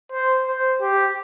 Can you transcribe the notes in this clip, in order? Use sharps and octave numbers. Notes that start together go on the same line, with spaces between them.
C5
C5
G4